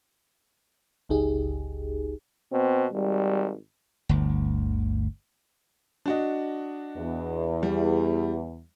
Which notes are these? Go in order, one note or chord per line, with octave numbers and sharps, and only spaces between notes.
G1 C#2 D#4 G4 G#4
B2 C4
G#1 G3
G1 D2
D4 F#4 D#5
E2
G3